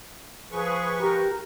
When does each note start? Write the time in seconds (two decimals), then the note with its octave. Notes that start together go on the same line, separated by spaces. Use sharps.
0.52 F3 G#4 B4 C#6
1.00 G4 A#4